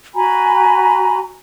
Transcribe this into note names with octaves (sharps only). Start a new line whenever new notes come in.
F#4 G#5 A#5 B5